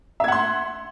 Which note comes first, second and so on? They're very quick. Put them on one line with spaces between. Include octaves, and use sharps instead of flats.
E5 G#6 F#5 C6